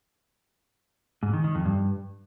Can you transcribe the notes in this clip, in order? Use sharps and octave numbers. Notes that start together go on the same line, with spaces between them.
G#2
D#3
D#3
F2
G2